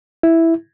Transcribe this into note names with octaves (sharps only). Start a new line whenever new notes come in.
E4